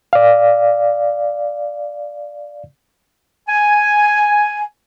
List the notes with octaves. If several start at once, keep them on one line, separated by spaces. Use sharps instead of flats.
D5 F5
G#5